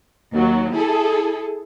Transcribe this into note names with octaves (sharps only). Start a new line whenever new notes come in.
D#2 F#3
E4 G#4 A4